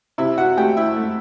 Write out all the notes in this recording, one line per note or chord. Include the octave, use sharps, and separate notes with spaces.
C3 E4 E5
F#4 F#5
A3 G4 G5
E4 E5
A3